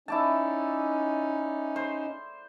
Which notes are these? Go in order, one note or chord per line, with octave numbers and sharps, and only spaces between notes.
C#4 D#4 E4 D5 A5
C5